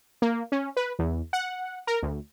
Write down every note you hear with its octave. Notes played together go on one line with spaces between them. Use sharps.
A#3
C#4
B4
E2
F#5
A#4
D2